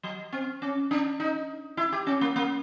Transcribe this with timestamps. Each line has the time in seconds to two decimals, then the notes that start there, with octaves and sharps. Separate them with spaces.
0.03 F#3
0.32 C4
0.62 C#4
0.91 D4
1.20 D#4
1.77 E4
1.92 G4
2.07 C#4
2.21 A#3
2.36 A#3